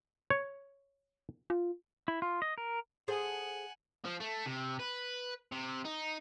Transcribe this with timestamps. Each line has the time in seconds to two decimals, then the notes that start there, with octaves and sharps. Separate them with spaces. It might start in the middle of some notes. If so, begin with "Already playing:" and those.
0.30 C#5
1.50 F4
2.08 E4
2.22 F4
2.42 D#5
2.58 A#4
3.08 G#4 A4 C5 F#5 G#5
4.05 F3
4.20 A3
4.46 C3
4.80 B4
5.52 C3
5.85 D#4